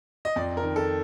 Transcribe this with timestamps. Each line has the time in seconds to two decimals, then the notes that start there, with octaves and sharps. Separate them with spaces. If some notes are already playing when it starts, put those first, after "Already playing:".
0.25 D#5
0.36 F2 D5
0.57 A#4
0.63 D#3
0.76 A4